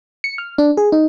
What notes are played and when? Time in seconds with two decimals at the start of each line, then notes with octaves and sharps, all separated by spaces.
0.24 C#7
0.38 F6
0.58 D4
0.77 G#4
0.92 D#4